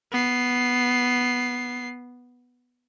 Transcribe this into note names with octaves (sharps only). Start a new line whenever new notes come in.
B3 C7